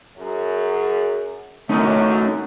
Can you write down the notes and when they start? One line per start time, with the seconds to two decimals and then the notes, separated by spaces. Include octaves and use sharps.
0.18 F#2 F#3 G#4
1.69 F#2 A3 C#4 D#4